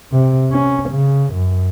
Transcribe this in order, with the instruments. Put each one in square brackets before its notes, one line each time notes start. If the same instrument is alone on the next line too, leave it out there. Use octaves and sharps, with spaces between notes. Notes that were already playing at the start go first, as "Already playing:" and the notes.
[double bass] C3
C#4
C#3
F#2